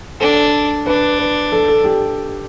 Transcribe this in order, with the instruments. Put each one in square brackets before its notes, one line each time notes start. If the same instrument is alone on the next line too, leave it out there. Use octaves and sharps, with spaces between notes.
[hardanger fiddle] D4 [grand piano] A4
[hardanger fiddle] D4 [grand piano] B4
[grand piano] B4
A4
A4
G4